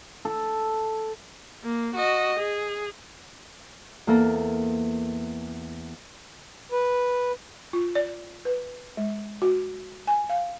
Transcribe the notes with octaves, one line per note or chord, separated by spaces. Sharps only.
A4
A#3
F#4 D#5
G#4
E2 A#3 A4 A#4 A#5
B4
F4
D5
B4
G#3
F#4
G#5
F5